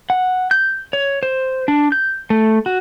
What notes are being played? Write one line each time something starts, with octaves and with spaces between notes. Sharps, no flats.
F#5
G6
C#5
C5
D4
G6
A3
F#4